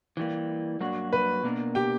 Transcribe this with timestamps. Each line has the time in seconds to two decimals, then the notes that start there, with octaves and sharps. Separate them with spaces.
0.17 E3 G3 A#3
0.80 G2 F#3 A#3 D4 F#4
1.13 B4
1.43 B2 A#3 D4 A#4
1.75 G4 G5